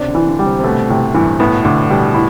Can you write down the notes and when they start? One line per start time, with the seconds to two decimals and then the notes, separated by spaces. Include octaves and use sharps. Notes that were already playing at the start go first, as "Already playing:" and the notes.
Already playing: C3 D4
0.08 D3
0.15 E3
0.27 D3
0.39 G3
0.46 C3
0.59 C3
0.64 B2 A3
0.89 A2 C3
1.14 G2 E3
1.40 A2 B3
1.54 B2
1.65 A2 D3
1.90 B2 G3
2.15 E4